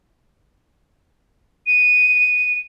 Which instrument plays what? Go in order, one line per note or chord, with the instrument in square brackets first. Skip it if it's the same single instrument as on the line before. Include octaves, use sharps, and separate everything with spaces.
[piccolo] D#7